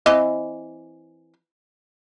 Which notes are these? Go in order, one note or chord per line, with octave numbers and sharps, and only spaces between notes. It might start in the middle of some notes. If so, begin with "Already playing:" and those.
E3 C4 D#5